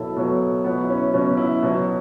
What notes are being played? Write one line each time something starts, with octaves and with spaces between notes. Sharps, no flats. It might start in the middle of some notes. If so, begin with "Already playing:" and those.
Already playing: B2 F#3 E4 A4
B2 F#3
B2 F#3 B3
E4
C#4
B2 F#3 C#4
E4
B2 F#3